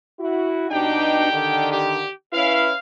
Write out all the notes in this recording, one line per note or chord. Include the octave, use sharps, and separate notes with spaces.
E4 F#4
B2 D4 D#4 G4 G5
D3 D#3
G4
C#4 E4 B4 F5